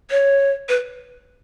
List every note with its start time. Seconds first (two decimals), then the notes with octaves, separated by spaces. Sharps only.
0.11 C#5
0.69 B4